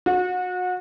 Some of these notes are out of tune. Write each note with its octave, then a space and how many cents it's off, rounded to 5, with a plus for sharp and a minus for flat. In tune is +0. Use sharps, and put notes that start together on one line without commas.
F#4 -30